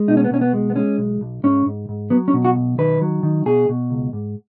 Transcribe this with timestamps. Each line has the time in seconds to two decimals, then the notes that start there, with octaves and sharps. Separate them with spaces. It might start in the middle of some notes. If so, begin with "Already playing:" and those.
Already playing: G#3
0.08 B2 D#4
0.17 C#4
0.24 B3
0.31 B2 C#4
0.41 B3
0.53 G#3
0.70 B3
0.76 G#3 C#4
0.98 B1
1.21 B1
1.43 G#2 C#4
1.66 G#2
1.89 G#2
2.10 F#3 B3
2.28 C#4
2.34 B2
2.45 F#4
2.56 B1
2.78 D#3 B4
3.01 F#3
3.23 D#3
3.46 B2 G#4
3.69 B2
3.90 C#2
4.13 G#2